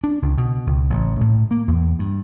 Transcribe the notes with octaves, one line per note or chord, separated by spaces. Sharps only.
D4
C#2
B2
C#2
A1
A2
A#3
E2
G2